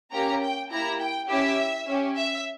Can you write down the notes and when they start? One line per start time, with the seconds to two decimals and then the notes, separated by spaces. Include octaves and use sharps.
0.11 A#3 C#4 G4 A#5
0.41 G5
0.70 A#3 E4 G4 A#5
0.99 G5
1.28 C#4 E4 G4 E5
1.86 C#4 G4
2.16 E5